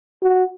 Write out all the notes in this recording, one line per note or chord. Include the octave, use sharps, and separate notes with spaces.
F#4